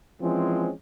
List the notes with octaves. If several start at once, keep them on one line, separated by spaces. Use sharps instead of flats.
E3 F3 G#3 C4 C#4